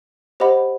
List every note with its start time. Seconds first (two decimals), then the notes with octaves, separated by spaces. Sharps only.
0.40 G4 C5 D#5 F#5 B5